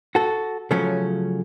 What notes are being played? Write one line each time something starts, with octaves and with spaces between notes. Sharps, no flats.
F#4 A4
C#3 F3 F#3 A3 C#4